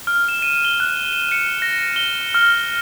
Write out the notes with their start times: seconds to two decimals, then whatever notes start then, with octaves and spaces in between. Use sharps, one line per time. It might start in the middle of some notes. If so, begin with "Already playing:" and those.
0.07 F6
0.28 E7
0.42 D#7
0.65 G7
0.80 F#6
1.13 E7
1.32 C#7
1.62 A#6
1.96 G7
2.34 F6